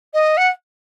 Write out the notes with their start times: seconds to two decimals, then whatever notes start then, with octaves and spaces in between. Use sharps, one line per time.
0.14 D#5
0.37 F#5